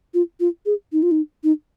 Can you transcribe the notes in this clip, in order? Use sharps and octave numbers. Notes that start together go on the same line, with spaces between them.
F4
F4
G#4
D#4
F4
D#4
D#4